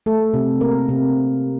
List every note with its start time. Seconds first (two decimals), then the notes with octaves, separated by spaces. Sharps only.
0.06 A3 A4
0.34 C3
0.61 C3 A#3 A#4
0.89 C3